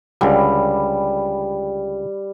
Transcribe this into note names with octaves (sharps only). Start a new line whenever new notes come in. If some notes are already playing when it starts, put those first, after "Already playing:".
C#2 D3 G3